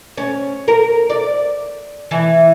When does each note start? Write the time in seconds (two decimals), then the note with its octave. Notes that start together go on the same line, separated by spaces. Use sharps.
0.17 C#4
0.68 A#4
1.10 D5
2.11 E3